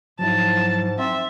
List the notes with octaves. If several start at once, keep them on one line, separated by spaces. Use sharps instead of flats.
G#2 F3 F#3 E4 A5
C4 E5